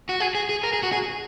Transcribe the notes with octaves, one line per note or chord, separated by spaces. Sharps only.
F#4
G#4
G#4
G#4
A#4
G#4
F#4
G#4